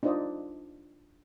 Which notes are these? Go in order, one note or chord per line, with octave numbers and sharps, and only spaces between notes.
D4 D#4 F4 C5 D5 D#5